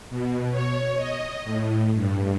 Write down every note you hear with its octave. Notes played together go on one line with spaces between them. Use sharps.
B2
C#5
D#5
A2
G2